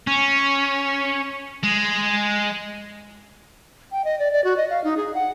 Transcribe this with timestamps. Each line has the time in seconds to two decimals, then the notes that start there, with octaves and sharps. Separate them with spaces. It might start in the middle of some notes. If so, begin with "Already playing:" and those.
0.07 C#4
1.63 G#3
3.92 G5
4.04 D#5
4.19 D5
4.32 D5
4.44 F#4
4.57 D#5
4.70 F5
4.84 D#4
4.97 G#4
5.14 F#5